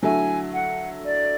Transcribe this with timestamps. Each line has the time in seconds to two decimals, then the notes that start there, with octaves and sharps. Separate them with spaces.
0.03 D3 F#3 A3 E4 G#5
0.53 F#5
1.05 D5